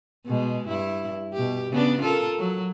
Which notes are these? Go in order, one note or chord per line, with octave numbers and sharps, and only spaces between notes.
B2 G#3
G2 E4
B2 G4
C#3 B3 D4
F4 A4 A#4
F#3